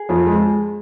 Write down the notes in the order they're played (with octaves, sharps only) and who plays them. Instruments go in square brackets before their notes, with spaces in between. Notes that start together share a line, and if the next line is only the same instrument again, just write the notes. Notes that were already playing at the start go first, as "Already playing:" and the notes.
Already playing: [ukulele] G#4
[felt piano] F2
G#3